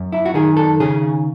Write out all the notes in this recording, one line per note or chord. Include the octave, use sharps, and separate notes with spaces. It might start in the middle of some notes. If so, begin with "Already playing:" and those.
Already playing: F#2
E4
F#4
D#3 G#4
A4
C#3 G#4